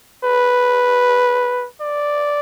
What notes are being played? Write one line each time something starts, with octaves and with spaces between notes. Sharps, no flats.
B4
D5